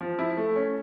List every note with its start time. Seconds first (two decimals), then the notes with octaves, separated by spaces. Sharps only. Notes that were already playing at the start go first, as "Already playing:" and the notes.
0.01 F3
0.19 E4
0.37 A3
0.56 C#4